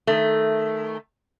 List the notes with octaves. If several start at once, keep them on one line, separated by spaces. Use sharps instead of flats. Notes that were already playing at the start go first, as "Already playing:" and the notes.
D#3 A3